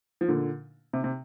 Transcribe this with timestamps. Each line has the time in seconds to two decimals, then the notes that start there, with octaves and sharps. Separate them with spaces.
0.21 F3
0.29 A#2 D3
0.93 C3
1.04 C3